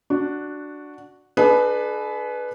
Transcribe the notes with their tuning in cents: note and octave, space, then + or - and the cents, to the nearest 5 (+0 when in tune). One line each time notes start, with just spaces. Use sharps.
D4 +0 F#4 +0
D4 +30 G#4 +45 B4 +0